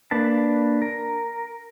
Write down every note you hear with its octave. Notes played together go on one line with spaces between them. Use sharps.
A#3 D4 B4 A5
A#4